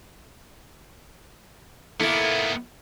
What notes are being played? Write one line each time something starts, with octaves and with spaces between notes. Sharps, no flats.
D#3 A#3 B3 E4 A4